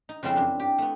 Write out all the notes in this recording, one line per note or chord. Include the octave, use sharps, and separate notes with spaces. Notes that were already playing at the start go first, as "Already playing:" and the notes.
D#4
F2 C#3 G#3 C4 C#4 E4
F#2 D4
G4
A3 B3